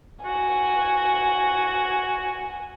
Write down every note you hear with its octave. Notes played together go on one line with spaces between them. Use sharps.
F#4 G#5